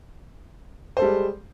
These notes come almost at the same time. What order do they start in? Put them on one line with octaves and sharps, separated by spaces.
C5 A4 G3 G#3